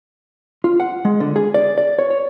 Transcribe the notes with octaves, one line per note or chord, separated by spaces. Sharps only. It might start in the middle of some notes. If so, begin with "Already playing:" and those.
F4
F#5
G#3
D3
G#4
D5
D5
C#5
C#5